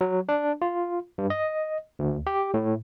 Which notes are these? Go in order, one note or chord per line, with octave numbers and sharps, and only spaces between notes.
F#3
D4
F4
G2
D#5
D2
G4
A2